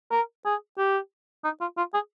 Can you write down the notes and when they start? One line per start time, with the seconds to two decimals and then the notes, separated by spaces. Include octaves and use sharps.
0.11 A#4
0.45 G#4
0.78 G4
1.45 D#4
1.61 F4
1.78 F4
1.94 G#4